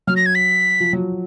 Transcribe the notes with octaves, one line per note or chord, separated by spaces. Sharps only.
F#3 F6
A#6
G#6
B6
F3
F#3